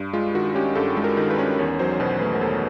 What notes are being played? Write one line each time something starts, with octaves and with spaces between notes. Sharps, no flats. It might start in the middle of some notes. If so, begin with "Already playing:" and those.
Already playing: G2
G#3 F4
D#3 F#4
C#4 G4
G2 A4
G#3
A#4
D#3
B4
C#4
E2 C#5
F#3 C5
B2 B4
A3 B4
A#4
E2 A4